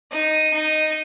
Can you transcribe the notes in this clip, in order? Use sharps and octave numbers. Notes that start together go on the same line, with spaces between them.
D#4
D#4